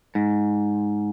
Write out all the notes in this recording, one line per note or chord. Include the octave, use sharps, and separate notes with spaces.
G#2